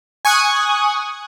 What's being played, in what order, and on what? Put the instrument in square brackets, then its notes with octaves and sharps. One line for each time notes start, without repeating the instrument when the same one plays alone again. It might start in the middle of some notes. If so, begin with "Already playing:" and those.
[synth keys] G#5 C#6 D#6 F#6